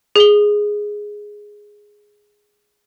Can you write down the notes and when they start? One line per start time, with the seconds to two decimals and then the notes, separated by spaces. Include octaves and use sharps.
0.16 G#4 G7